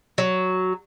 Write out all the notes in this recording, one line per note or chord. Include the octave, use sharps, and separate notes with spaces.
F#3